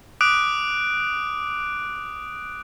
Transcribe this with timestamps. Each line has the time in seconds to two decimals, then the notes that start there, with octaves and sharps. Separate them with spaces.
0.21 D6 D#6 F#6 D7